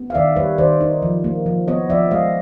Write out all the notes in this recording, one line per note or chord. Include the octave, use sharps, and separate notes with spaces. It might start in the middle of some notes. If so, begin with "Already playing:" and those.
Already playing: B3
F5
D#3 D5 E5
G3 B4 C#5
D#3 C5 D5
D#4
F3
A#3
F3
B3 C#5 D#5
F3 D5 E5
G#3 D#5 F5